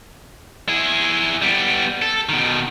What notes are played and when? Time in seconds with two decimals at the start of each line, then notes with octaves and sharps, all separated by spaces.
0.69 E4 G#4
1.42 G3 B3
2.02 A4
2.29 B2 D#3